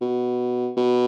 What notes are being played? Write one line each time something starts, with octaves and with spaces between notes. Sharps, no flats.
B2
B2